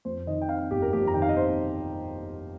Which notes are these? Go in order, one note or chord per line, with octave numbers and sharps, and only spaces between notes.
F2 C5
D#3 D#5
G5
C4 F5
G1 G4
A#4
F2 G4
A#5
D#3 G5
F5
D#5
C4 C5